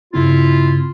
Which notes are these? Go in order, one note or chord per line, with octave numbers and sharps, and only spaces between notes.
G2 C#3 C4 E4 F4